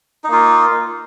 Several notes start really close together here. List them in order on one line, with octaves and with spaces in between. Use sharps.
D#4 A#3 F4